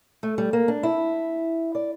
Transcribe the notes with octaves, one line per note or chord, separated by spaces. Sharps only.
A3
G3
A#3
D4
E4
D5